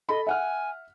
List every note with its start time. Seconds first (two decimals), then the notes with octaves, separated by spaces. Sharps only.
0.09 A4 D#5 B5
0.27 E5 F#5 G#5 F6